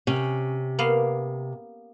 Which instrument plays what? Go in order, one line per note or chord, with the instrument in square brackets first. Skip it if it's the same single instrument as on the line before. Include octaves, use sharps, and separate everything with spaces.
[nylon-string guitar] C3 [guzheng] C#4
[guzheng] A#3 B3 F5